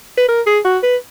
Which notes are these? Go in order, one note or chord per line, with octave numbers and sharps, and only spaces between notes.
B4
A#4
G#4
F#4
B4